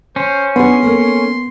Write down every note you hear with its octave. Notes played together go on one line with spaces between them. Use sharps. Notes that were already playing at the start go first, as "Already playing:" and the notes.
C#4 C5
B3 D4 G#4 C6
A3 A#3